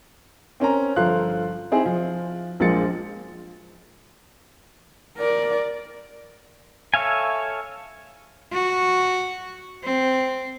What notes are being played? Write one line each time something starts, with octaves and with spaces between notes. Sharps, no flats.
C4 C#4 A#4 A#5
G1 F3 A4 F5 C6 F#6
C4 D#4 E4 G#4
F3
A#1 F3 G#3 A#3 A6 C#7
A#4 D5
A4 C#5 E5 F5 G#5
F#4
C4